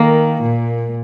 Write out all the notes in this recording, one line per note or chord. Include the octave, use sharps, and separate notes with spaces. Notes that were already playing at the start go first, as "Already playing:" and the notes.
Already playing: D#3 A#3
A#2